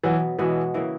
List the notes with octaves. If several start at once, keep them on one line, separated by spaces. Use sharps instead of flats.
B2 E3 F#3 B3
B2 E3 G#3 B3 F#4
C#3 E3 A#3 E4